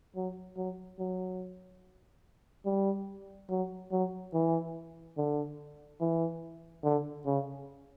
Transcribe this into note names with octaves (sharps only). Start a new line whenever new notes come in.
F#3
F#3
F#3
G3
F#3
F#3
E3
D3
E3
D3
C#3